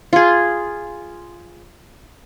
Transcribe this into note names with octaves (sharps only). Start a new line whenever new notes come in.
F4 G#4